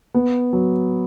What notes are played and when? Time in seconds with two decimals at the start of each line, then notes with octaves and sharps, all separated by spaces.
0.14 B3
0.53 F#3